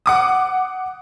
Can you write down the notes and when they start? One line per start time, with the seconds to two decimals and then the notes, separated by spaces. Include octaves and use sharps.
0.06 F#5 D6 D#6